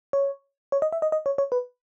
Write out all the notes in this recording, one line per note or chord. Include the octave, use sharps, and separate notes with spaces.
C#5
C#5
D#5
E5
D#5
D#5
C#5
C#5
B4